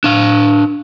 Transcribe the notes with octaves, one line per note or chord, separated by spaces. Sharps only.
D4 F5